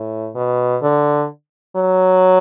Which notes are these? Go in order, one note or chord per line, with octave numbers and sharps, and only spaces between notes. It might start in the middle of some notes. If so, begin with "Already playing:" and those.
Already playing: A2
B2
D3
F#3